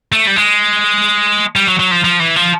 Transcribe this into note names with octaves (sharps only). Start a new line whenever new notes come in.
A3
G3
G#3
G3
F#3
F#3
F3
F3
E3
F3